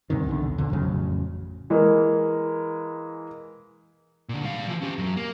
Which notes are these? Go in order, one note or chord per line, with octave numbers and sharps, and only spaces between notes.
E2 G2 C3 D#3
B1 E2 D3
E2 A#2 D3
A1 F2 C#3 F#3
E3 G#3 A#3
A#2 D3
G3 F5
E3 F3
C#4 G4
F#2 F#3
A#3